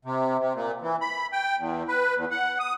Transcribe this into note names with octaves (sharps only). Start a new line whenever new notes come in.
C3
C3
A#2
E3
B5
G5
E2
B4
E2
F#5
D#6